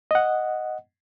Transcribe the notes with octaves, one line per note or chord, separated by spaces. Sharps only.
D#5 F#5